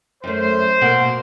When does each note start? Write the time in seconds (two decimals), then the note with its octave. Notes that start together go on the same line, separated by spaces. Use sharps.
0.24 F#2 A3 C5
0.81 B2 A#3 F#5